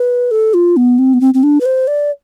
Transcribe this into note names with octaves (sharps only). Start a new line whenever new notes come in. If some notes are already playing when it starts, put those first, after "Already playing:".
Already playing: B4
A4
F4
B3
C4
B3
C4
C4
D4
B4
C5
D5